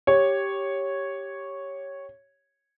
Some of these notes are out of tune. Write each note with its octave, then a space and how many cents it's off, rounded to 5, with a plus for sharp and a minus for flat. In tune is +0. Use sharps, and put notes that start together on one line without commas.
G4 +0 C#5 -5